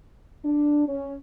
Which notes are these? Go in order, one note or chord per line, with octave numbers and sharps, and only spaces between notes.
D4
C#4